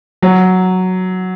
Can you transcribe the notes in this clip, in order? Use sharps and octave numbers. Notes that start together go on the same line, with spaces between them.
F#3